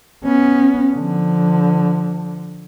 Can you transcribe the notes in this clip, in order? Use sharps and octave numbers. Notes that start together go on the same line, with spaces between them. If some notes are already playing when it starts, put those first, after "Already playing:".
B3 C#4
D3 F3